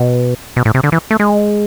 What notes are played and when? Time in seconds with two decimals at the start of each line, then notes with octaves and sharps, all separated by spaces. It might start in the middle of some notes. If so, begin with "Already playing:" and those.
Already playing: B2
0.56 B2
0.65 A2
0.74 C3
0.83 D3
0.92 E3
1.11 A3
1.20 G#3